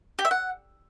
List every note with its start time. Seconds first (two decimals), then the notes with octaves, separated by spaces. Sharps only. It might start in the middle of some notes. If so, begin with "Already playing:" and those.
0.19 G4
0.25 E5
0.31 F#5